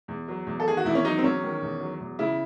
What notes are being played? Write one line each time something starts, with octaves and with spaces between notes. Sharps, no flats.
E2
F#3
E2
A4
D#3 G#4
F#4
E2 E4
C#4
F#3 D#4
C4
E2 C#4
D#3
E2
F#3
E2
C#3 E4